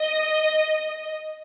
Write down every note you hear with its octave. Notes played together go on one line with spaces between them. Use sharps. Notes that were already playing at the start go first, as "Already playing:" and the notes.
Already playing: D#5